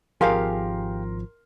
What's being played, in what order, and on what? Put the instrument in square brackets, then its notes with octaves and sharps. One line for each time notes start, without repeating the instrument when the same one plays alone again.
[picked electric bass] G#1 F3 [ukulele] G4 G#4 F5 [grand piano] A#4 C6